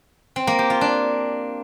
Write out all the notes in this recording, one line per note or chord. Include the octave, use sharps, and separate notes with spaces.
C4
A#3
G4
F4
D4